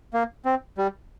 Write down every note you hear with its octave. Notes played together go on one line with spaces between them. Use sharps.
A#3
C4
G3